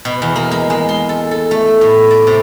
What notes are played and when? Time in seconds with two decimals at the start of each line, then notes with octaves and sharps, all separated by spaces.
0.05 B2
0.22 E2
0.36 A#3
0.51 G#3
0.70 G#3
0.89 C6
1.09 A4
1.31 A4
1.51 A3
1.81 A2
2.11 D5
2.27 C3